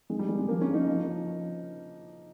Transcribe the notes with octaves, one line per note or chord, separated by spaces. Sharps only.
D#3 G#3
G3
D#3 G#3
G#3
F3 A#3
C#4
F3
D#4
F3
F3